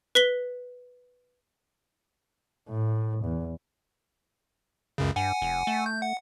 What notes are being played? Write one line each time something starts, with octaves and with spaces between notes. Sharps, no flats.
B4 B6 G7
A2
E2
C#2 F#2 C#3
G2 F#5 G#5
F1
A3
G6
F#5